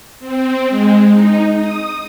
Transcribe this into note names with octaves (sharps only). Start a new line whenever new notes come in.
C4
G#3
D#4
D#6